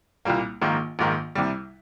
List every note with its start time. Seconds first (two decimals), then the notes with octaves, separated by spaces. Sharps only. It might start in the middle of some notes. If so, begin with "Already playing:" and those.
0.25 C2 A#2 G3 A#3
0.62 A#1 G#2 D#3 A#3
0.99 A#1 G#2 D#3 A#3
1.35 C2 C3 G3